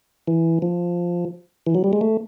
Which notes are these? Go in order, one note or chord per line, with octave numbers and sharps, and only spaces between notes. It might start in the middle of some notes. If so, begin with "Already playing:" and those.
E3
F3
E3
F#3
G3
G#3
A3